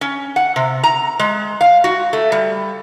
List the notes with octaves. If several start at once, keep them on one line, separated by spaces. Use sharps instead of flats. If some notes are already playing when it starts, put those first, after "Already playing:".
C#4
F#5
C3
A#5
G#3
F5
F#4
A3
G3